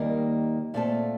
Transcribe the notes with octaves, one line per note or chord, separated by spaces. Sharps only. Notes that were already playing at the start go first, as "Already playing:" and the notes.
Already playing: D#2 D#3 G3 A#3
A#2 A3 C4 F4 A4